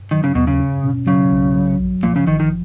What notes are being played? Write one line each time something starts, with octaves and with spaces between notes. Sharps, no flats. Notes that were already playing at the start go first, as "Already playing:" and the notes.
D#3 F#3
C#3
D#2 B2
C#3
C#4
B2
C#3 F#3
B1
F#3
A#1
A#2 F3
C#3
G#1 D#3
D#3